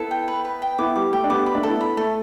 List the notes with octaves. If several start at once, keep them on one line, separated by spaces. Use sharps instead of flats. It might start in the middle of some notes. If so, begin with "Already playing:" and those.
Already playing: B3 E4 A4
G5
B4
B4
G5
B3 E4 D6
G3 D6
A3 G5
D4
G3 B3 D6
B5
A3 D4
B3 E4 A4
B5
A3 A4